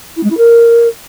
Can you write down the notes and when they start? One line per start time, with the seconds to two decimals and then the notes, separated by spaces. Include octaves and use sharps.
0.16 E4
0.23 G#3
0.30 E4
0.37 A#4